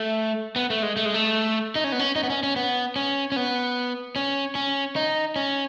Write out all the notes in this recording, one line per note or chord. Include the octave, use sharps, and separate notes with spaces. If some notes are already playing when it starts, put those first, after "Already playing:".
Already playing: A3
B3
A3
G#3
A3
G#3
A3
D#4
C#4
B3
C#4
D#4
B3
C#4
C#4
B3
C#4
C#4
B3
C#4
C#4
D#4
C#4